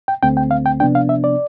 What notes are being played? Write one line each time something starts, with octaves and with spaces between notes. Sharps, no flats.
G5
D2 D3 A3 C4 G5
G5
F5
G5
C3 F3 B3 D4 G5
F5
E5
D5